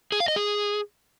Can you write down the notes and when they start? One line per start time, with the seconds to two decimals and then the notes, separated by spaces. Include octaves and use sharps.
0.12 G#4
0.20 F5
0.28 D#5
0.36 G#4